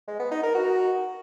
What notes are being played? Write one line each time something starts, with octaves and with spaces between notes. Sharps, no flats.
G#3
B3
D#4
A#4
F#4